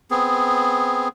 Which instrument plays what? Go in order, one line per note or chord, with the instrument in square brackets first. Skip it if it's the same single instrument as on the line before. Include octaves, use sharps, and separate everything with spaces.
[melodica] B3 C4 G#4